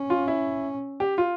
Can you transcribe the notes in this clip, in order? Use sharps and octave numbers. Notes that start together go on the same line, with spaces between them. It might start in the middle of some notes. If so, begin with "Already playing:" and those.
Already playing: C#4
F4
E4
G4
F4